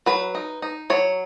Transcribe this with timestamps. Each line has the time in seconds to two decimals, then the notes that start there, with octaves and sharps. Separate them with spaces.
0.06 F#3 B4
0.35 D#4
0.62 D#4
0.90 F#3 C#5